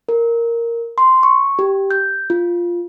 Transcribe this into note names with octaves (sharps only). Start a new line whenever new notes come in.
A#4
C6
C#6
G4
G6
F4